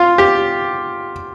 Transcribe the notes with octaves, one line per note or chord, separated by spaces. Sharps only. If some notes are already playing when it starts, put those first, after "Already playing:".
Already playing: F4
G4